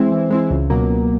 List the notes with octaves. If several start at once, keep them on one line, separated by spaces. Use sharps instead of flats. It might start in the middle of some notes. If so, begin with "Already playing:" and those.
Already playing: E3 G#3 C4 E4
E3
G#3 C4 E4
C#2
B2 F#3 A#3
C#2